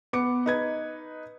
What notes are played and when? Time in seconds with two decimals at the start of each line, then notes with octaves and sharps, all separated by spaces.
0.13 B3 D6 C#7
0.46 D#4 B4 G#6